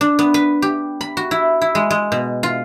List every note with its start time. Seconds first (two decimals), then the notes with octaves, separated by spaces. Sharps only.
0.01 D4
0.19 B3
0.34 B4
0.62 G4
1.01 B5
1.17 F#4
1.31 E4
1.62 E4
1.75 G#3
1.91 G#3
2.12 B2
2.43 F4